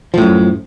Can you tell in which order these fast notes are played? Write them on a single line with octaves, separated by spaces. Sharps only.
F3 A2 F#2